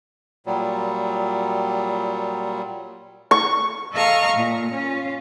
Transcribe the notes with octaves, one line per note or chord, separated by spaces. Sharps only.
A#2 F#3 G3
C#6
A4 D#5 F5 A#5 C#6 F6
A#2
C#4 F4